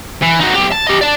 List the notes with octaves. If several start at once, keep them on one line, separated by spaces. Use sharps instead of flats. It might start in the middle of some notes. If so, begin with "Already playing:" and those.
E3
D#4 F#4
B1 G4
A5
G4 D#5
D5 A5